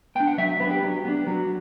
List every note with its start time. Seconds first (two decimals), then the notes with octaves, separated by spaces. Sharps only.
0.15 B3 G5
0.20 D4
0.27 F#5
0.38 F#3 E5
0.60 B3 B4
0.65 D4
0.71 G4
0.82 F#3
1.05 B3 D4
1.27 F#3 F#4